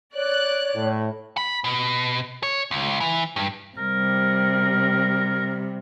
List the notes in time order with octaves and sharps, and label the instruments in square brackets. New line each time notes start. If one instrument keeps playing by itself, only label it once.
[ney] C#5 [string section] D5 F#6
[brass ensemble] A2
[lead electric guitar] B5
B2
C#5
C#2
E3
G2
[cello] C3 G3 [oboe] A#4